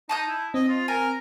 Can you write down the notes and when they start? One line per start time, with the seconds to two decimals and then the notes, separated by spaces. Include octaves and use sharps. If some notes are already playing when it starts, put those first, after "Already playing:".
0.09 D#4 A5 D#6 G6
0.28 E4
0.54 C4 D#5
0.69 F4
0.88 A#4 G#5